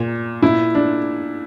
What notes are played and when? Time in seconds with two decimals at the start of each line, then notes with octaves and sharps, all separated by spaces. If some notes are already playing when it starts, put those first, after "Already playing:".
Already playing: A#2
0.42 A#2 E4
0.75 D4